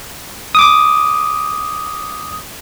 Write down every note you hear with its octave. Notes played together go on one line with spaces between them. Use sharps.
D6 D#6